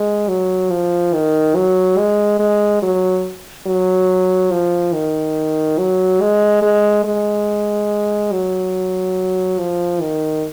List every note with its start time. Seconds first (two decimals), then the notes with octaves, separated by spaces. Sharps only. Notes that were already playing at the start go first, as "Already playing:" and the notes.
Already playing: G#3
0.28 F#3
0.70 F3
1.14 D#3
1.56 F#3
1.98 G#3
2.40 G#3
2.82 F#3
3.67 F#3
4.52 F3
4.93 D#3
5.79 F#3
6.21 G#3
6.62 G#3
7.04 G#3
8.32 F#3
9.59 F3
10.01 D#3